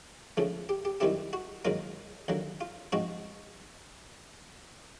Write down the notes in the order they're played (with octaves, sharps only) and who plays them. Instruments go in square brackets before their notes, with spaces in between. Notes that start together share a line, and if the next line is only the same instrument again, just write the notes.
[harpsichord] C#2 C#3 F3 A3
G4
G4
F#2 D#3 G3 C4 E4 G4
F#4
G#2 D#3 F#3 A#3 D#4 F4
D#2 D3 F#3 A#3
F4
G#2 F3 G#3 C4 F#4